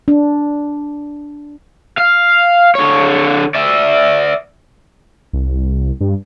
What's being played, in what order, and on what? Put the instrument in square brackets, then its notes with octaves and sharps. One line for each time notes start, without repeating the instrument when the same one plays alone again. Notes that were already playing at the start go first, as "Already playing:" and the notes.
[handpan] D4
[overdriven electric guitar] F5
D3 C#5
D5 E5
[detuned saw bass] C2
G2